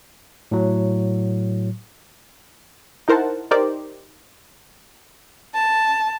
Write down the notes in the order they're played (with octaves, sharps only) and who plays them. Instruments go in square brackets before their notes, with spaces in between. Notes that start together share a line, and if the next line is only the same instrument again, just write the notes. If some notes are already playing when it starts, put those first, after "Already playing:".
[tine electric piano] A2 F#3
[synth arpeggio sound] D#4 E4 A#4 C5 F#5 A5
D#4 G4 A#4 C5 D5
[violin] A5